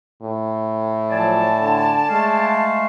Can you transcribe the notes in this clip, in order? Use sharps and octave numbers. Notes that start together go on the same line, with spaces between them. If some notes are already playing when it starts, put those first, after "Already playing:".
A2
F3 F#3 D5 G#5 A5
D3
G#3 A3 F5